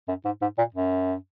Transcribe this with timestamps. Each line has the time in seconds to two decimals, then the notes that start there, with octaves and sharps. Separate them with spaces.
0.08 F#2
0.25 G#2
0.42 G#2
0.58 A#2
0.75 F#2